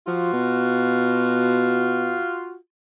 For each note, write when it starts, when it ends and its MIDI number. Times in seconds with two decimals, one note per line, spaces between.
0.07 0.32 53
0.07 2.56 65
0.07 2.56 66
0.33 2.18 47